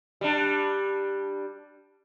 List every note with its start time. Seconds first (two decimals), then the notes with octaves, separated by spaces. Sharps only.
0.21 G3 D4